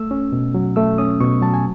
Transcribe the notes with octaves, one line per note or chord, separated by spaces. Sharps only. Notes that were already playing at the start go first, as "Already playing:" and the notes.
Already playing: A3 E6
C#4
B2
F#3
A3 E6
C#4 D#6
B2 C#6
F#3 A5
G#5